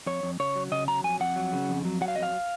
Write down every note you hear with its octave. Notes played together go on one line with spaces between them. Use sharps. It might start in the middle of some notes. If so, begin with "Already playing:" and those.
F2 C#5
F2
C#3 C#5
F#3
C#3 D#5
F#3 A#5
F2 G#5
F2 F#5
F#3
C#3
F2
F#3
F#3 F#5
F5
F2 D#5
F5